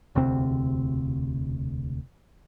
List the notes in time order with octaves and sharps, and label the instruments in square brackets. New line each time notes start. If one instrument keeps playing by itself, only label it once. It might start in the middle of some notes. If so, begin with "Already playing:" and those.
[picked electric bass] E1 D2 C3 C4